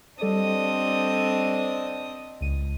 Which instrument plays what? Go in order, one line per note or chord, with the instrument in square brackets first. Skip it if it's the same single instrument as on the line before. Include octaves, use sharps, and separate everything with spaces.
[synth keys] G3 A4 D5 [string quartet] C4 D4 D#5
[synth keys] C#2 D#7